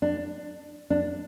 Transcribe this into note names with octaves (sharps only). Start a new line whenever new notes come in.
D4
D4